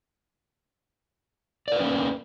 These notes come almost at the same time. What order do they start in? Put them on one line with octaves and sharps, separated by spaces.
D5 A#4 B4 C#4 A#3